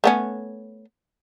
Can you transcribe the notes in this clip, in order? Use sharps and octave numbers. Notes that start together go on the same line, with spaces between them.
A3 B3 C#4